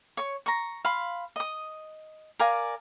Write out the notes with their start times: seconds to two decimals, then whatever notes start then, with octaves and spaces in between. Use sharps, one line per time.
0.17 C#5 C#6
0.46 A#5 C#6
0.85 F5 B5 C6
1.36 D#5 D#6
2.39 A#4 D5 F5 G#5